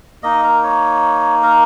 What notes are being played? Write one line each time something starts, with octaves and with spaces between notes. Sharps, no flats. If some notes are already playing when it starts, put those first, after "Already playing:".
A#3 D#4 D#5
A#4
C#5
A#4